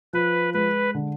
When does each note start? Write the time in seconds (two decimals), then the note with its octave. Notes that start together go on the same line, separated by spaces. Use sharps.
0.13 F3 B4
0.54 G#3 B4
0.94 D3